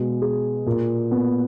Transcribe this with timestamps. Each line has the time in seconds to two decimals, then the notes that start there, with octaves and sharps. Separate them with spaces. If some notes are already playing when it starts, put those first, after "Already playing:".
Already playing: B2 G#3
0.22 G#4
0.66 A#2
1.11 B3